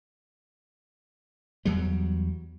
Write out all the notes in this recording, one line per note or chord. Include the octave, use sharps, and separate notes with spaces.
E2 F#3 G3